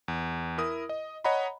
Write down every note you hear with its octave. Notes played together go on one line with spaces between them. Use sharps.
E2
E4 A#4 D#6
D#5
C#5 D#5 F#5 A#5 B5